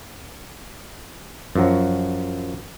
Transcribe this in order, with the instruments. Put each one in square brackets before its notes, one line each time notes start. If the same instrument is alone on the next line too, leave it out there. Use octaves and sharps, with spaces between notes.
[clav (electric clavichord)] F#2 F3 F#3